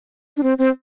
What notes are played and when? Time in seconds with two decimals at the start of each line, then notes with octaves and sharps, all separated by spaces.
0.37 D4
0.43 C4
0.58 C4